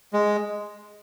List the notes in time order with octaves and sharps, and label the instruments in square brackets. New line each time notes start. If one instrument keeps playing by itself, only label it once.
[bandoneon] G#3